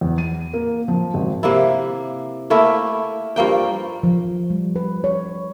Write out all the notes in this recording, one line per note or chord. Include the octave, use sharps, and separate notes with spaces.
E2
D#7
A#3
F3
G#1
C3 A#3 E4
A3 A#3 E4 A#4
G2 F3 A#3 G5
F3
G3
B4
C#5